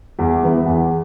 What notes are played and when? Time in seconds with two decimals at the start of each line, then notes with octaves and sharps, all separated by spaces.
0.19 E2
0.43 E3 B3 E4
0.66 E2